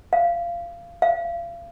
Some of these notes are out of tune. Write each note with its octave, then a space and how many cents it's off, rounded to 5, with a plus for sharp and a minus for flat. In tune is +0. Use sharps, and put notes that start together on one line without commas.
F5 -20
F5 -35